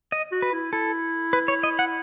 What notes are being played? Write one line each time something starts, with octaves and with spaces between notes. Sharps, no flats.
D#5
F#4
B4
E4
E4 A4
B4
C#5
D#5
F#5